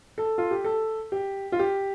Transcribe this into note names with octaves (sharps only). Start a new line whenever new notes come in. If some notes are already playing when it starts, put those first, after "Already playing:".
A4
F4
G4
A4
G4
F4
G4